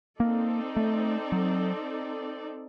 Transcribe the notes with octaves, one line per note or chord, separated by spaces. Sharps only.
A#3 C4 D#4 A4 D5
A3
F#3